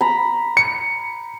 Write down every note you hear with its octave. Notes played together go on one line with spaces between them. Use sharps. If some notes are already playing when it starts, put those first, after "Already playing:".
A#5 B5
C#7